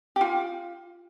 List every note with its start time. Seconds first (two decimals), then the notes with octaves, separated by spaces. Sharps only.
0.16 G4
0.21 F4